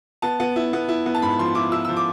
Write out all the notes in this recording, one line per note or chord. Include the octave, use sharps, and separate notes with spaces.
B3 A5
B3
E4
B3
E4
B3
A5
G#2 B5
F3 C6
E4 D6
E4 E6
E6
F3
D6